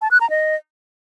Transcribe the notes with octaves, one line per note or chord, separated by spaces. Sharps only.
A5
F#6
A#5
D#5